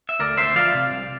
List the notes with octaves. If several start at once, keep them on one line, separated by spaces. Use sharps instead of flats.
E5
D2 A#4 D5
D2 C5 E5
F3 D5 F5
C3
C2